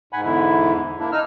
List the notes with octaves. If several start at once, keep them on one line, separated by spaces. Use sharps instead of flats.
G#2 F#5 G#5 B5
E2 D3 E4
A#3 D4 E4
D#4 E6 F6